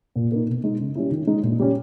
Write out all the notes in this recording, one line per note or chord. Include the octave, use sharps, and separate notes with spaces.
A#2
A#3 D#4
B2
G#3 D#4
C#3
G3 C#4 E4
D#3
G#3 D#4
A#2
G3 C#4